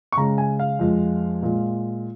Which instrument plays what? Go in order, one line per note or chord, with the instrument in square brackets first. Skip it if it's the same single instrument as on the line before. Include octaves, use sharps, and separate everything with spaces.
[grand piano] C#6
C#3 G#3 A#5
G#5
F5
F2 F3 G#3
A#2 G#3